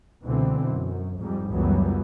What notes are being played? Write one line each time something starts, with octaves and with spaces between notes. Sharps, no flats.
C#2 B2 D3 E3 C4
F#2
F2 G#2 G3
C#2 F#2 E3 F#3 G3 B3